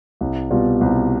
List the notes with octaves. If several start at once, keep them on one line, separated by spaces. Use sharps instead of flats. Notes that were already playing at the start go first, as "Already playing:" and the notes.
C2
B2 G3 B3 F4
C2